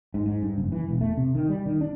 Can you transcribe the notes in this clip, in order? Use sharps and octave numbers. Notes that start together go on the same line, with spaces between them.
G#2
G#2
G2
F#1
E3
E1
A3
C3
D#3
G3
D#3
D4